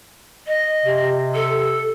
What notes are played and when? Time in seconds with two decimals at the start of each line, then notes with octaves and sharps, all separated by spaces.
0.47 D#5
0.85 C3
1.34 A4